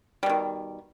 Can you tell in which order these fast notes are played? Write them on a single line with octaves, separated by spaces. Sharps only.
G3 B2 D#3